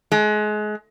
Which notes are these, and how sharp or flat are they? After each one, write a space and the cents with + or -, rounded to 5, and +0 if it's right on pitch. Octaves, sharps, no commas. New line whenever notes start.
G#3 +30